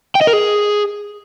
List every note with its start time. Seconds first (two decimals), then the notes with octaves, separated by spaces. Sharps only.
0.15 G5
0.21 D#5
0.27 A#4
0.33 G#4